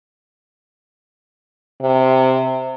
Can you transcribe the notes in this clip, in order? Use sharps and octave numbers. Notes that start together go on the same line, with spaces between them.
C3